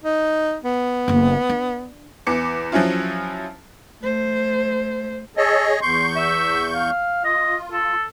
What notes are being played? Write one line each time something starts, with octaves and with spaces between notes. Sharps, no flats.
D#4
B3
F#1 A#3
D4
E2 E3 D6 C#7
F3 F#3 C#4 E4 F4
A3 C5
G#4 A4 C#5 D#5
E2 C6 C#6 G6
E5
F5
F4 D#5
A4